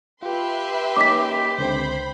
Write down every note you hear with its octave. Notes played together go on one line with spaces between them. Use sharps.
F4 G4 B4 E5 C6
A#3 C#4 D#4 D6 B6
C#2 D3 C4 C5 B5